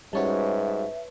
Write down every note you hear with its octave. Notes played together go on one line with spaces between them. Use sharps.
G#2 G3 C#4 F#4 B4 C#5 E5 A5